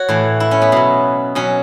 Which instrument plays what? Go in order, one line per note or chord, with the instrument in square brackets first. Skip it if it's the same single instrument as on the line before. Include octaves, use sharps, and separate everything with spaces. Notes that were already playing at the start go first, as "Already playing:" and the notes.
Already playing: [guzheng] F#4 C#5
A2 E3
E4
C#4
B3
B2 F#3
B2 F#3 C#4